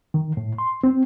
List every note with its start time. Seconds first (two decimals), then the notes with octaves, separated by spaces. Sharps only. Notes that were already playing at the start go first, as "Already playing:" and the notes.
0.14 D#3
0.37 A2
0.58 C6
0.84 C4